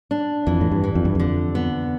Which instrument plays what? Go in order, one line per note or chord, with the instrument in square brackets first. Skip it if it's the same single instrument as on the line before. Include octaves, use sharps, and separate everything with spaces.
[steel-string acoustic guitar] D4
[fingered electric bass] F2 [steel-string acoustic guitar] E3
[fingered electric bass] A2
G2
[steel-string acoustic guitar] E3
[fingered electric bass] F2
G2
[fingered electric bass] F2 [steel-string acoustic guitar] D3
[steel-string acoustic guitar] B3